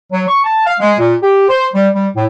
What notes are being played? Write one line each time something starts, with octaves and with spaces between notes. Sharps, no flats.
F#3
C#6
A5
F5
G#3
A#2
G4
C5
G3
G3
A2